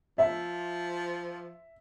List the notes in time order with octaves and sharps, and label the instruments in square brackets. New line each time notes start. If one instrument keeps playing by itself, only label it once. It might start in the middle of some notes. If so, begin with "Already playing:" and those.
[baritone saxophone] F3 [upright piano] E5